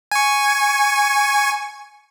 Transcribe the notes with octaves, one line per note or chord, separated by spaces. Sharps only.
G#5 C#6